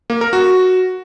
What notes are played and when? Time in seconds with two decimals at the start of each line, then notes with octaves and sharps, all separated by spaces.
0.10 A#3
0.21 A#4
0.33 F#4